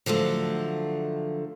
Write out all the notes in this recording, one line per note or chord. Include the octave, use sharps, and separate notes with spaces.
D3 F3 F#3 A3